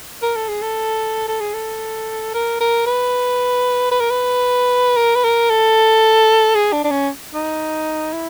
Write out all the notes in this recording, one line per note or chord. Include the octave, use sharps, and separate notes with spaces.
A#4
A4
G#4
A4
A4
G#4
A4
A#4
A#4
B4
B4
A#4
B4
A#4
B4
A#4
A4
G#4
D4
D4
C#4
D#4
E4